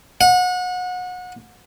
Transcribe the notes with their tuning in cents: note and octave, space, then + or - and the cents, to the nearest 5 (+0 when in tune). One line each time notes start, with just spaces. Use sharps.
F#5 -30